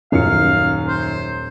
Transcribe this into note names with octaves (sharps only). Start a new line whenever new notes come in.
D#1 F#2 D#3 F5 F6 C#7
C5